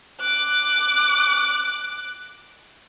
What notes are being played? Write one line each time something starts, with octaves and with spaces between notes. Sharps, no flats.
D6 F#6